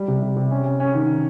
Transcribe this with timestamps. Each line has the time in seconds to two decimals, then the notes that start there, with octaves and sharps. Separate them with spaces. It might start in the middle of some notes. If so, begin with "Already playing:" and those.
Already playing: G3
0.08 C3
0.23 C3
0.36 C3
0.51 C#4
0.65 C#4
0.80 C#4
0.95 D#3